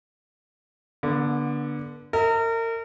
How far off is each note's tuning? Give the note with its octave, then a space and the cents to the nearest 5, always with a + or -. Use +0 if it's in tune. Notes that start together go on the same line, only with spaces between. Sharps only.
D3 -10 B3 -40
A#4 -35 D#5 +45